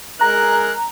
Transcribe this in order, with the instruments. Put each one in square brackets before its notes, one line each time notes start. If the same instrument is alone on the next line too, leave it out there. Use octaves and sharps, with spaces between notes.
[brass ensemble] G#3 G#4 A#4 [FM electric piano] A#5 [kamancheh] F#6